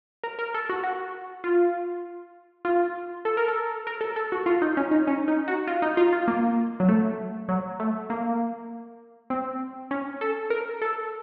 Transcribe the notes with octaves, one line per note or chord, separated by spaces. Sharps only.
A#4
A#4
A4
F#4
F#4
F4
F4
A4
A#4
A4
A#4
A4
A4
F#4
F4
D#4
C#4
D#4
C#4
D#4
F#4
F4
D#4
F4
F4
A#3
F#3
A3
F#3
A3
A#3
C4
C#4
A4
A#4
A4